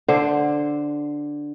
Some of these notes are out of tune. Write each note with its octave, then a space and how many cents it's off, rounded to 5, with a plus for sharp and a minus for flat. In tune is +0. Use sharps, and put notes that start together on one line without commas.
D3 +0 D4 +0 C5 +0